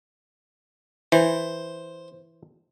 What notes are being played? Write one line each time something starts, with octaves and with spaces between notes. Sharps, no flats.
E3 C5